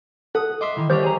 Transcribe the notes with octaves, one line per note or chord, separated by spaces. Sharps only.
A4 F#5 D#6
D#5 E5 C6 D6
D#3 E3
D#2 G3 C5 C#5 D6
G#4 A#5